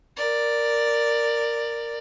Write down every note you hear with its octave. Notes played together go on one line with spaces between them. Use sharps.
A#4 D5